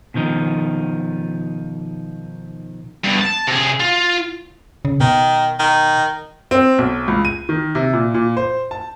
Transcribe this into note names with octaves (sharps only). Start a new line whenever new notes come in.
B2 D#3 F3 D#4
G2 B2
A5
C3 G#4
F4
C#3
B2 D#3
D#3
C4
B1
C#2
D#7
D#3
C3
A#2
A#2
C5
A5